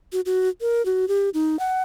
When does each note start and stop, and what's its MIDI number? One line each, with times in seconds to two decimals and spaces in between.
0.12 0.21 66
0.26 0.49 66
0.61 0.85 70
0.85 1.08 66
1.08 1.30 67
1.34 1.59 63
1.59 1.83 78